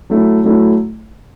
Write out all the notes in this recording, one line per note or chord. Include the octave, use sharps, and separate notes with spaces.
F#3 A3 E4
F#3 A3 E4